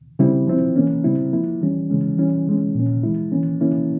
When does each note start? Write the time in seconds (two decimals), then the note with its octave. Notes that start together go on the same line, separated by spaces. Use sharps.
0.19 C#3 G3 C4 E4
0.47 F3 C4 E4
0.76 E3 A#3 C#4
1.04 C#3 G3 C4 E4
1.33 F3 A#3 E4
1.62 E3 G3 C#4
1.90 C#3 E3 G#3 C#4
2.18 E3 G3 C#4 E4
2.47 E3 G#3 C#4
2.75 A#2 F3 A#3 C#4
3.03 E3 G#3 E4
3.32 E3 A#3 C#4
3.60 E3 A#3 C#4 E4